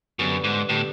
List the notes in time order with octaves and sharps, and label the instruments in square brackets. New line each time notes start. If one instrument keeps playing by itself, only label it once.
[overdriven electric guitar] F#2 [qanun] D3 G3 B3
[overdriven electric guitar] G#2
[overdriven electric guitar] A2 [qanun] D3 G3 B3